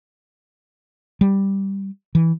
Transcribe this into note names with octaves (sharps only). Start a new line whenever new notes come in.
G3
E3